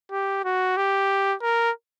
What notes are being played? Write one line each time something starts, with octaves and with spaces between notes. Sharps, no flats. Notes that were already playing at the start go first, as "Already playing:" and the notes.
G4
F#4
G4
A#4